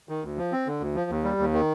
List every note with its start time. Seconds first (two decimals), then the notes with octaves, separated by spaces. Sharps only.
0.09 D#3
0.23 D2
0.38 F3
0.52 C4
0.67 D3
0.80 D2
0.95 F3
1.10 D#2
1.24 G3
1.39 D#2
1.54 D#3